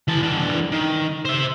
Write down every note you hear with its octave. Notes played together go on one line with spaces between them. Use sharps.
E3 A5
E3 D4
D#3
C5 E5